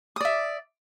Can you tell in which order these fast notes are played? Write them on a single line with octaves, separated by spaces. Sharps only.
D#6 D5 E5